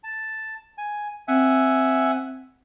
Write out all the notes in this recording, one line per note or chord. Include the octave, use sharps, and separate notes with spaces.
A5
G#5
C4 E5 F#5 G#5